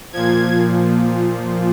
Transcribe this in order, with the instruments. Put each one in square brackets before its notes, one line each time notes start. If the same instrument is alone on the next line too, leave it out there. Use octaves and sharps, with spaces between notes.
[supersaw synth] A#2 F3 G#6